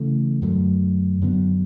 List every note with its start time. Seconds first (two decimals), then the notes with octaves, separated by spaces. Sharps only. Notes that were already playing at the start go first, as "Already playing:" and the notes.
Already playing: C#3 E3 A3
0.42 F#2 D3 F#3 A3
1.22 F#2 D3 F#3 B3